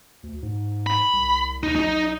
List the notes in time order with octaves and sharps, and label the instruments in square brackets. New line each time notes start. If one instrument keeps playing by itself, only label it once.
[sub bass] D2
G#2
[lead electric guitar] B5
[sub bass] C2
[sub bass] D#2 [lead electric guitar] D#4
[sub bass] B1 [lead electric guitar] D#4